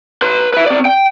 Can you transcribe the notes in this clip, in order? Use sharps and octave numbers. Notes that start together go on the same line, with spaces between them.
B4 C6
B4 E5
C4 D5
G5